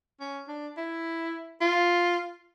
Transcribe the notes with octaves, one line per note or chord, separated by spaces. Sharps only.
C#4
D4
E4
F4